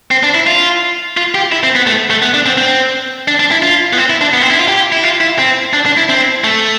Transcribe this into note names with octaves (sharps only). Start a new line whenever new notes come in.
C4
D4
E4
F4
F4
G4
E4
C4
B3
A3
A3
B3
D4
C4
C4
D4
D4
E4
F4
B3
C4
E4
D4
B3
C4
E4
F4
G4
E4
F4
E4
C4
D4
D4
E4
C4
A3